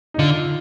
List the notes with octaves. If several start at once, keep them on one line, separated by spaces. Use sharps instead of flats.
D#4
D3 F4